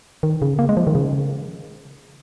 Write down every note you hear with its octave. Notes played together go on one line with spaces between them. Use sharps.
D#3
C#3
A#3
G#3
F3
D#3
C#3